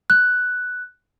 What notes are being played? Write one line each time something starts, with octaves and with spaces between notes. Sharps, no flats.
F#6